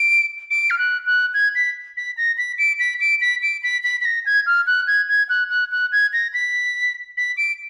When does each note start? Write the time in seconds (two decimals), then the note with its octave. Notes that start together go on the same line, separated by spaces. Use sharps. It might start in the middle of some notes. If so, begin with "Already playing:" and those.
Already playing: D7
0.50 D7
0.70 F6
0.78 F#6
1.06 F#6
1.34 G#6
1.55 B6
1.97 B6
2.17 A#6
2.38 B6
2.58 D7
2.79 B6
3.01 D7
3.21 B6
3.43 D7
3.63 B6
3.83 B6
4.01 B6
4.05 A#6
4.26 G#6
4.46 F6
4.67 F#6
4.87 G#6
5.08 G#6
5.29 F#6
5.50 F#6
5.72 F#6
5.92 G#6
6.13 A#6
6.34 B6
7.17 B6
7.37 D7